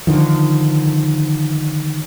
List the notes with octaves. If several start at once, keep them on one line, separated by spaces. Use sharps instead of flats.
D3 D#3 F3